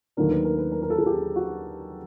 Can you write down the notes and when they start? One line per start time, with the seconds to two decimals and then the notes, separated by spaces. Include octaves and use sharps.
0.17 D#2 D#3 F#3 A3 D4 A#4
0.31 B4
0.44 A#4
0.58 B4
0.72 A#4
0.82 A#4
0.90 A4
0.98 G#4
1.06 G4
1.36 F#4